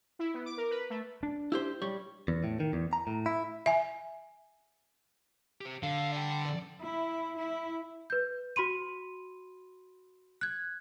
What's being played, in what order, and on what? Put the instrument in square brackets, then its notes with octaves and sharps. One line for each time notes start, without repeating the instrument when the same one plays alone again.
[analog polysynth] E4
B3
D6
A#4
B4
A3
[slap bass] D4
[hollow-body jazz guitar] E4 G4 C5
G3 C#5
[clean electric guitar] E2
A2
D#3
E2
A#5
A2
E4
[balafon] E5 G#5
[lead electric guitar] G4 C5
[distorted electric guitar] D3 [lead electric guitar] F5
[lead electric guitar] D5 G5
D5
[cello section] E4
E4
[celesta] B4 G6
F#4 B5 C6 D#7
F#6 G#6